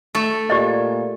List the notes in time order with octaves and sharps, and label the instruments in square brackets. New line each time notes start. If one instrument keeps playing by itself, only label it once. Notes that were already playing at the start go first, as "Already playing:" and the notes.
[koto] A3 A4
[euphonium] A#2 [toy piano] G4 D5 D#5